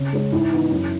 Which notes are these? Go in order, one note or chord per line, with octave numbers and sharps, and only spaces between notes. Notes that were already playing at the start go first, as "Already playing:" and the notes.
Already playing: C#3
G#3 C#4
G#2 E4
E3 B3 D#4
F#2